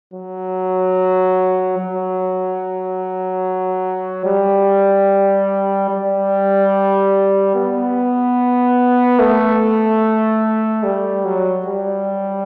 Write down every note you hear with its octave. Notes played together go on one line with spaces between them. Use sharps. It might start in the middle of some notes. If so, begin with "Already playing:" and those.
F#3
F#3
G3
G3
B3
A3
G3
F#3
G3